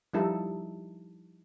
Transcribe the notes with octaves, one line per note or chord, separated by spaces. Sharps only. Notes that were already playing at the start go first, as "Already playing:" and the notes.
F3 G3 D#4 E4 A4